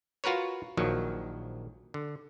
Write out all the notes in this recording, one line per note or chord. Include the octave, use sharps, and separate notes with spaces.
F4 F#4 A#4 B4 C#5
A#1 D#3 F3 F#3
D3